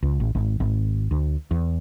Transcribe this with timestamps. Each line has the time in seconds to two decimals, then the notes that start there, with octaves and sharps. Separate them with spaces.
0.03 C#2
0.20 A1
0.35 G#1
0.60 G#1
1.11 D2
1.51 E2